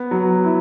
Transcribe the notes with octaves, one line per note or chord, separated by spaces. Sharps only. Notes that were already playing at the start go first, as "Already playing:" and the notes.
Already playing: B3
F#3
E4